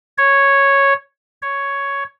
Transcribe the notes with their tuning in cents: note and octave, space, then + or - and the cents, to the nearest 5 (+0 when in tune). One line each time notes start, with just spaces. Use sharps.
C#5 -5
C#5 +5